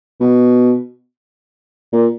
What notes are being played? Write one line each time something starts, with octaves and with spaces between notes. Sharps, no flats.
B2
A#2